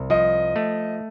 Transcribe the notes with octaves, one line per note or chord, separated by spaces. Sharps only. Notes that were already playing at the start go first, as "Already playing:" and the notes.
Already playing: C2
F3 D#5
A3